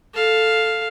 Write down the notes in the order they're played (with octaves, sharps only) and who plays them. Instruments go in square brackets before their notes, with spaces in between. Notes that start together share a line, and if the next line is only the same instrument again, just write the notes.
[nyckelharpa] A4 F5